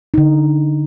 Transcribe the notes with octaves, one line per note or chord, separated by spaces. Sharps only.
D3 D#4